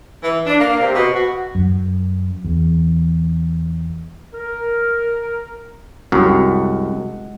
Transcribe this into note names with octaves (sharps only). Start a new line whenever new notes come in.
E3
D4
A#3
C3
B2
F#4
F#2
E2
A#4
C2 F#2 G#3 F#5